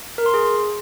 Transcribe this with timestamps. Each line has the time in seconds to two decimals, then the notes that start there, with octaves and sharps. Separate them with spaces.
0.18 A#4
0.26 C6
0.34 G#4